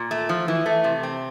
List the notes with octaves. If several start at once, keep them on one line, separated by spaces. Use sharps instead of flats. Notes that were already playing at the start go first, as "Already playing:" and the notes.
Already playing: A#2
A3
F3
E3
A3
C3
C4